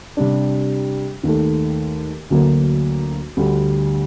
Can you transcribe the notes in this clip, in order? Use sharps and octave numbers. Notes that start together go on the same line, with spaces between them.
C3 G3 D4
D#2 D#3 A3
D2 D3 F#3 A#3
D2 D3 G3